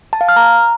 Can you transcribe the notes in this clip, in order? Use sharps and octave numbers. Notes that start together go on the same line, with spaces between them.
A5
F5
F6
A#5